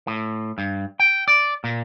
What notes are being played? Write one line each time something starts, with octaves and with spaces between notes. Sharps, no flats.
A2
G2
G5
D5
A#2